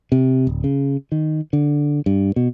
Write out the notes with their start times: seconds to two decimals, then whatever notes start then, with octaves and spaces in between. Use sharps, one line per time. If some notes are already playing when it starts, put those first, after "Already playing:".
0.12 C3
0.47 D1
0.64 C#3
1.12 D#3
1.53 D3
2.06 G2
2.36 B2